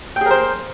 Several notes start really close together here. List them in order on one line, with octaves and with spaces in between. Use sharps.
G5 G#4 A#4 C5